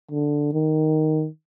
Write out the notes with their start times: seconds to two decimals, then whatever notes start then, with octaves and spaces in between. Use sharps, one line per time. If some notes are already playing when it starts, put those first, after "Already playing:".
0.11 D3
0.53 D#3